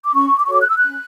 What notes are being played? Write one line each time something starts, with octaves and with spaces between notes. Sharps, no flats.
D6
C#4 C#6
D6
C#6
F#4 A4 C#5 D6
F#6
E6
F#6
C#4